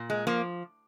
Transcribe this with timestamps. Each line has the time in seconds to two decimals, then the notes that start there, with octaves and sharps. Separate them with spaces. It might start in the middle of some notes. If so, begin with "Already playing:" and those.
Already playing: A#2
0.10 G#3
0.27 F3 A#3